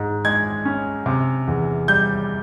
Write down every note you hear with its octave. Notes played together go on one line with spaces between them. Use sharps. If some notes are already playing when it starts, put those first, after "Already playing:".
Already playing: G#2
G#3 G#6
C#4
C3
E2
G3 G6